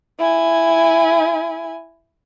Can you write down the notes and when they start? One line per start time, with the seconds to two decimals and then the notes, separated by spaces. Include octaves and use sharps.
0.19 E4 G#5